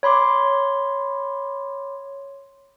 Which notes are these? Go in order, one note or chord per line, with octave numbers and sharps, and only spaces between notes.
C#5 B5 C6 D6